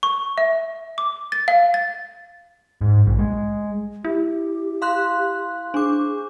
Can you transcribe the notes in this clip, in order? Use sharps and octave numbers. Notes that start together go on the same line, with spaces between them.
C#6
E5
D6
A6
F5
A6
G#2
A#1
G#3
E4 G4
F5 C6 F#6
D4 G#4 D6